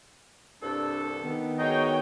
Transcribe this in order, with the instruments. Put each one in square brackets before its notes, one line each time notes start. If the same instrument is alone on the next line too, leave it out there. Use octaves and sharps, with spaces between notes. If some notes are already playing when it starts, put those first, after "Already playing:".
[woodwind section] C2 G2 A4 [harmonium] D4
[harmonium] D#3 B3
[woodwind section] G#3 D#4 [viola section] F#4 C#5 G5